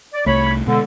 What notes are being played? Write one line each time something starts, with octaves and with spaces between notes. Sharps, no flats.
D5
C2 A3 C#5 B5
B2 D3 G#3